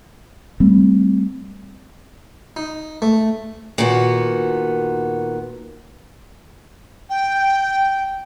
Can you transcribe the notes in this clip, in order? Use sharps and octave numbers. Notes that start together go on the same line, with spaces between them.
G3 A3 C4
D#4
A3
A#2 D#3 B3 F#4
G5